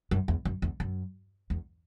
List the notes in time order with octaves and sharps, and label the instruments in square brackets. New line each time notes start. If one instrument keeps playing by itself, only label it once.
[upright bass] F#2
E2
F#2
E2
F#2
E2